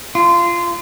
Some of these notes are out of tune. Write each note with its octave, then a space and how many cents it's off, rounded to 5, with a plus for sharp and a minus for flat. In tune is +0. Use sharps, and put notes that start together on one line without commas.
F4 -20